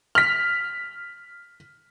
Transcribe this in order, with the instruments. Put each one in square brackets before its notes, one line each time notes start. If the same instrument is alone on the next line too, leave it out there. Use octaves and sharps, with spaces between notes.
[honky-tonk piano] F6 B6